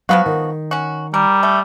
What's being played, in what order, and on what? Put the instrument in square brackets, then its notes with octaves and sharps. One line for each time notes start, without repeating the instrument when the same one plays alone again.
[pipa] F3 B3 F#4 [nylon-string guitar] F#3 F5
[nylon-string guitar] D#3
[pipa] C#4 F#4
[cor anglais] G3 [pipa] A#4
[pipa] A3